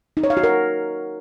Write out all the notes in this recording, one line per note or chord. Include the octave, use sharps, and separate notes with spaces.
D#4
C#5
F5
F#4
A#4